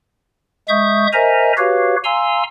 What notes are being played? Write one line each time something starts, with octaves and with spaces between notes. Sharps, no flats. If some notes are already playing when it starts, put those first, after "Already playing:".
G#3 E5 C#6 D#6 G6
A#4 C5 D#5 E5 G#5 A#5
F#4 G4 B4 C#5 F5
F5 G#5 A#5 C6 E6